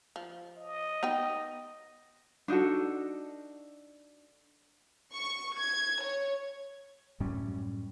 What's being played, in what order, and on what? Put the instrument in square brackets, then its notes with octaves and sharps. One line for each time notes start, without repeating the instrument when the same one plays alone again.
[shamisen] F3
[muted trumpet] D#5
[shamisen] B3 D#4 G5
[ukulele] D4 D#4 F#4 A4
[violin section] C#6
G#6
C#5
[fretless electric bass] F#2 A2 G3 C#4